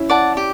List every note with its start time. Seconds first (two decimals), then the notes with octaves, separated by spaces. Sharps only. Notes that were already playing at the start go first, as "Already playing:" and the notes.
Already playing: C#4 E4
0.10 D5 F#5 A5
0.37 G4